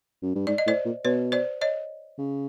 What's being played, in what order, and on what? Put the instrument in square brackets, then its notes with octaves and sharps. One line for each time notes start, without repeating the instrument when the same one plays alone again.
[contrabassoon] F#2
G2
[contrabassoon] G#2 [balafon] D5
[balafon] D#5
[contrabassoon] A2 [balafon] C5 D5
[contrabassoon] A#2
[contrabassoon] B2 [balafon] B4 C#5
[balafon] C5 D5
C#5 D#5
[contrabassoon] C#3